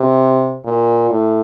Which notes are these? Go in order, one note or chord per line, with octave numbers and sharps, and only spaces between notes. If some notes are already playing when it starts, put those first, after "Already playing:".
Already playing: C3
A#2
A2